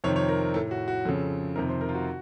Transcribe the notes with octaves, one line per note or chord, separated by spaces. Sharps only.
F2 C3 D#3 C#5
C#5
A#4
A2 A4
F#4
F#4
F2 C#3 A4
F2 C3 D#3 A#4
C5
A#4
F4
F#4